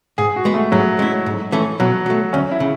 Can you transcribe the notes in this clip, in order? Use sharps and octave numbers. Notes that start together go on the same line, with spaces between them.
G#2 G#4
F#4
G#3 B3
A3
G#2 F#3
G#3 C#4 E4
G#2
E3 A3 C#4
B2 F#3
F#3 A3
D2 C#4
E4
C#3